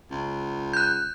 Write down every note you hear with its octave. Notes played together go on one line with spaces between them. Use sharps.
C#2
F#6 G6